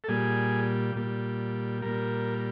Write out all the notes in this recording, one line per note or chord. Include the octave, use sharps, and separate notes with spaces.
A4
A#2 G3 G#4
A#2 G3
A#2 G3 A#4